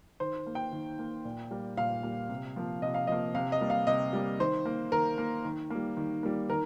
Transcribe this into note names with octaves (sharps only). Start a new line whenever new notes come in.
D#3 C5
A#3
G5
D#3
A#3
A#2
G3 A#3
A#2 F5
G3 A#3
C3
F3 A#3
C3 D#5
F5
F3 A#3 D#5
C3 F5
D#5
G3 A#3
F5
C3 D#5
G3 A#3
D#3 C5
A#3
D#3 A#4
A#3
D#3
G3 A#3
D#3
G3 A#3
D#3 A#4